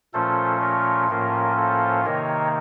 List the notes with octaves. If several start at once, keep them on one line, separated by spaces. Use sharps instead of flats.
A#2 F3 A3 C#4 F4 A4 C5
A#4 C#5
A2 F3 A#3 C#4 F4 A#4
A4 C5
C3 D#3 A#3 D#4 A#4 C#5